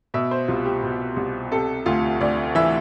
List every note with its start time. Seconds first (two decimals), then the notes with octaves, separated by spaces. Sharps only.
0.14 B2 E5
0.31 C5
0.48 C2 F4
0.65 G4
0.83 B2
1.16 C2
1.51 C3 A4
1.86 D2 F4
2.21 D2 D5
2.55 E3 E5